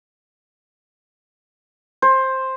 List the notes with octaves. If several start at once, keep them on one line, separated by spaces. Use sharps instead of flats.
C5